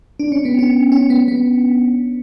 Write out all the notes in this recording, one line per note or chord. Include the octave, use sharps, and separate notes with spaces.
D4
C#4
B3
C#4
C#4
B3
B3